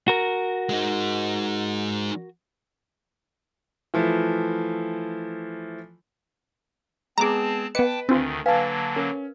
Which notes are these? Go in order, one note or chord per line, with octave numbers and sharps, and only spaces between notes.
F#4 A#4
G#3 D#4
E3 F3 A3
G#3 B3 C4 G#4 A5 A#5 D6
B3 B4 D#5 G5 A5 D6 C#7
D2 D3 D#3 C4 D4 F4
D3 F#3 A#3 B4 F5 G#5 A5
C#4 A#4